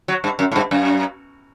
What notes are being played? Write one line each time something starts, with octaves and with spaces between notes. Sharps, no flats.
F#3
G2
F#2
A2
G2
F#2